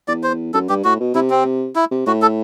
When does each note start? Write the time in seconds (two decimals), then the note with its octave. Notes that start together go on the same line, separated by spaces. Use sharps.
0.08 E2 D5
0.23 C5
0.54 F#2 A4
0.69 G2 G4
0.85 A2 F#4
1.00 B2
1.15 C3 E4
1.30 C4
1.76 E4
1.91 C3
2.06 A2 F#4
2.22 A4